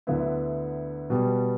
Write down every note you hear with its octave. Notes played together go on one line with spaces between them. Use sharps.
D2 D3 B3 E4
B2 G3 B3 G4